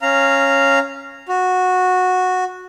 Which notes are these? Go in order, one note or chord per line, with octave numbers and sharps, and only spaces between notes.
C#4 F5 A#5
F#4